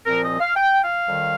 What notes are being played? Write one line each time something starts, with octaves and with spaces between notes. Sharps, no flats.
C2 A#2 F3 C4 A#4
D#5
F5
G5
F5
F2 D#3 G3